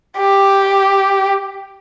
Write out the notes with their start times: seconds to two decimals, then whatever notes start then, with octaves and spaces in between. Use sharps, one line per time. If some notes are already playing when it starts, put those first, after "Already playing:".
0.18 G4